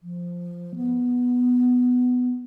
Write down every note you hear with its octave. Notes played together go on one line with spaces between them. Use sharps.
F3
B3